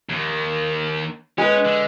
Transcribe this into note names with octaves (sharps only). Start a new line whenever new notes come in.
D#2 D#3
G#3 C#4 B4
D3